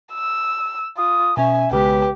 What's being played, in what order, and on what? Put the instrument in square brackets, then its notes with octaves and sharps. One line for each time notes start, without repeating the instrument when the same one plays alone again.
[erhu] E6
[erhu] F4 [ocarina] D#6
[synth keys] B2 C#4 [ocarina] E5 [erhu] G#5
[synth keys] B1 C#3 G#3 [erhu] G4 [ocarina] B4